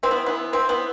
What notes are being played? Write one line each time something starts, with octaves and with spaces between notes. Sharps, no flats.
E3 C4
B3
E3 B3
E3 C4
B3